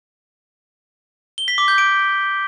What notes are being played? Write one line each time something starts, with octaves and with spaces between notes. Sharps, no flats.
G7
B6
D6
G6
D7